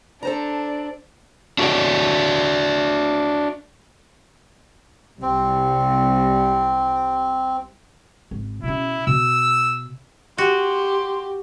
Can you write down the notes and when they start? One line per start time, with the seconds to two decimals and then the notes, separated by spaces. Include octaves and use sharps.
0.23 D4 A4 C5 A#5
1.58 D4 F#4 G4 A#4 C#5 D5
5.22 C2 C4
8.31 G#1
8.63 B2 C#4 E4
9.07 B2 E6
10.38 F#4 G4 C6